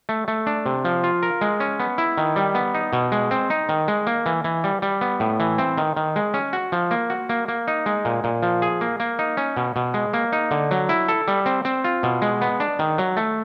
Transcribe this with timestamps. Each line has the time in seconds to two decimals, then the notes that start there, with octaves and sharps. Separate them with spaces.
0.09 A3
0.28 A3
0.47 D4
0.66 C3
0.85 F3
1.04 F4
1.23 A#4
1.41 G#3
1.60 C#4
1.80 B3
1.98 E4
2.17 D#3
2.36 G3
2.55 B3
2.74 D#4
2.93 B2
3.12 G#3
3.31 C4
3.50 D#4
3.69 D#3
3.88 G#3
4.07 A#3
4.26 E3
4.44 E3
4.64 G3
4.82 G3
5.01 B3
5.20 A2
5.40 E3
5.58 C4
5.78 D#3
5.97 D#3
6.16 G#3
6.34 C#4
6.53 F#4
6.72 F3
6.91 A#3
7.10 F#4
7.29 A#3
7.48 A#3
7.68 D#4
7.86 G#3
8.05 A#2
8.24 A#2
8.42 F3
8.62 G#4
8.81 A#3
9.00 A#3
9.19 D#4
9.37 C#4
9.57 B2
9.76 B2
9.94 G#3
10.13 A#3
10.33 D#4
10.51 D3
10.71 F#3
10.89 E4
11.08 A4
11.28 G3
11.46 C4
11.65 C4
11.84 F4
12.03 B2
12.22 G#3
12.42 B3
12.60 D4
12.79 D#3
12.98 F#3
13.17 A3